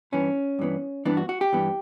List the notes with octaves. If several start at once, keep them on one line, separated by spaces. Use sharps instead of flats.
G2 E3 B3 C#4
G2 E3 B3
G2 E3 B3 D4
F#4
F#4
G4
G2 E3 B3